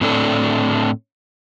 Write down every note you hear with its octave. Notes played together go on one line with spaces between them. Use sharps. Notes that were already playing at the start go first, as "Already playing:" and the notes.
A2 C4 D4 A4